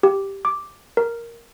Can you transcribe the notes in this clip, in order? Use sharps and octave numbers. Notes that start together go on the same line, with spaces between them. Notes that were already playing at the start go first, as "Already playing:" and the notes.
G4
D6
A#4